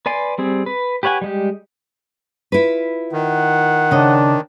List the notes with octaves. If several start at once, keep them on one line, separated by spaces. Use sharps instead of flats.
B4 D5 G#5 C6
G3 C4 G#4
B4
G4 B4 C#5 F#5 G#5
G3 G#3 G4
E4 F4 B4
D#3 F#5
C#3 D4 D#5